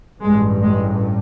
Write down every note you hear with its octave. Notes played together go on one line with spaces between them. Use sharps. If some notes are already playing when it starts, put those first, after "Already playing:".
A1 G2 G#3
G#3